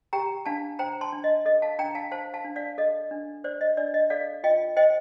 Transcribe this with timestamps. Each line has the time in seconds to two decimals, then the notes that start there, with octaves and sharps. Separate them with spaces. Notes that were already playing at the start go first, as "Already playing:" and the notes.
0.13 G4 G5 A#5
0.46 D4 F5 A5
0.79 C5 G5 A#5
1.01 A5 C6
1.12 D4
1.24 D#5
1.46 A4 D#5
1.62 F5 A5
1.79 D4 G5 A#5
1.95 F5 A5
2.11 C5 F5 A5
2.34 F5 A5
2.45 D4
2.56 D5 F5
2.78 A4 D#5
3.11 D4
3.44 C5 D5
3.61 D#5
3.77 D4 D5
3.94 D#5
4.10 A4 D5 F5
4.44 F4 D#5 G5
4.77 C5 D#5 G5